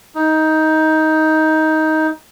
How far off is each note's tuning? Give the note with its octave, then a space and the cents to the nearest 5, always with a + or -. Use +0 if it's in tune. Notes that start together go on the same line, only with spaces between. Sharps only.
D#4 +15